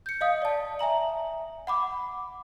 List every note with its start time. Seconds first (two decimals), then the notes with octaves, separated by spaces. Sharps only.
0.06 G6 C#7
0.21 D#5 F5 D#6
0.42 D5 A5
0.79 E5 G#5 A#5 F#7
1.67 F#5 B5 D6